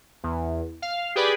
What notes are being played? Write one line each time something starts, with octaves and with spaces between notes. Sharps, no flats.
E2
F5
G4 G#4 B4 D5 B5